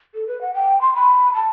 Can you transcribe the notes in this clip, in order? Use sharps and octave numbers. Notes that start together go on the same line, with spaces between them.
A4
B4
F#5
G5
C6
B5
A5